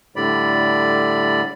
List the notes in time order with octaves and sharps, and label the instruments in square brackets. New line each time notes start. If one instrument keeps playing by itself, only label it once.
[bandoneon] A2 D3 G3 D5 B5